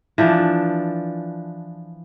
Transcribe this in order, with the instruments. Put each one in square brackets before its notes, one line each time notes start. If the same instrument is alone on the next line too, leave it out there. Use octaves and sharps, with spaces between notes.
[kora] E3 F3 D4